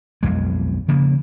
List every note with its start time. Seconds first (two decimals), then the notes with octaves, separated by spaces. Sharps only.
0.23 B1 F2 G#3
0.88 C#3 F3 A#3